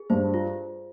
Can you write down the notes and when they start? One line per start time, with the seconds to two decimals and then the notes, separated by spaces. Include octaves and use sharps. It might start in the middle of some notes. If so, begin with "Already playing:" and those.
Already playing: G#4
0.10 G2 C5
0.34 F4